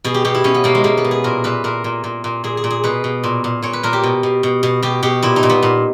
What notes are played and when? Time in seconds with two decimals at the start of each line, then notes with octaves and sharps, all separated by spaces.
0.04 B2 G#4
0.14 G4
0.25 B2 G4
0.35 E4
0.44 B2 C#4
0.54 B3
0.64 B2 A#3
0.75 G#3
0.84 B2 A#3
0.97 B3
1.04 B2
1.11 G#4
1.24 A#2 A#4
1.44 A#2 B4
1.64 A#2 A#4
1.84 A#2
2.04 A#2
2.24 A#2
2.44 A#2 G#4
2.57 G#4
2.64 A#2
2.70 G#4
2.84 B2 B4
3.04 B2
3.24 A#2
3.44 A#2
3.62 A#2 C#5
3.73 B4
3.83 A#2 A#4
3.93 G4
4.03 B2
4.23 B2
4.43 B2
4.63 B2
4.83 B2 G4
5.03 B2 G4
5.23 A#2 E4
5.36 D#4
5.43 A#2
5.50 B3
5.63 A#2